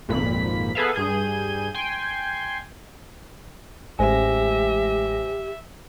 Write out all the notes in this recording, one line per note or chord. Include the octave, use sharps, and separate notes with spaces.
G#1 F2 A#2 B5 B6
B3 G#4 A4 B4 E5 F5
G2 G#4 G6 D#7
G5 G#5 C6
A1 G#3 G4 C5 E5 G#5 A#6